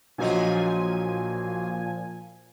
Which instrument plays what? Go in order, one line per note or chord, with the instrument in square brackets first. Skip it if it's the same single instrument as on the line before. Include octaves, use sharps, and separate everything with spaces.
[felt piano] A#1 F#3 D#5 [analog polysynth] A#2 F3 G#5